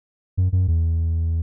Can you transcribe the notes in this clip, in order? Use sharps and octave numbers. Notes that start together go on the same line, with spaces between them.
F#2
F#2
E2